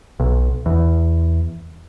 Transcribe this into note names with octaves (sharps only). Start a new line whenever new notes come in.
B1
E2